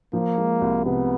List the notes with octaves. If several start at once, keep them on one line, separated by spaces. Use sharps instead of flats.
F3 A#3
G#3
C2
C3 B3